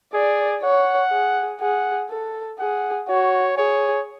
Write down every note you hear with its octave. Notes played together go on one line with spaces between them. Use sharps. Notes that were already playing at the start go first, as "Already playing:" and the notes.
G#4 D5
C#5 F#5
G#4
G#4 F#5
A4
G#4 F#5
F#4 C#5
G#4 C#5